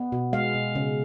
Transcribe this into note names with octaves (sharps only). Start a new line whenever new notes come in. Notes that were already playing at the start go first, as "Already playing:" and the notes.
Already playing: B3
B2
G#3 F5
B2
C#3